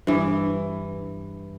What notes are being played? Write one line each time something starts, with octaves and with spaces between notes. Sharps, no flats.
G2 E3